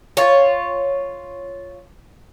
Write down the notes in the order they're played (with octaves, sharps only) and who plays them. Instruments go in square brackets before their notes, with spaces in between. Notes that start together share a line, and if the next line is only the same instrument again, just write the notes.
[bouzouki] F4 C#5